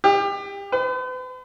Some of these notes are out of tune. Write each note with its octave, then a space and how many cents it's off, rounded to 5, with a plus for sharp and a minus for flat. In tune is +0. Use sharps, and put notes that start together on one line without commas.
G4 +30
B4 +45